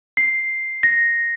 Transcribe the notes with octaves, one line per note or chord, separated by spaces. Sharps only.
C7
A#6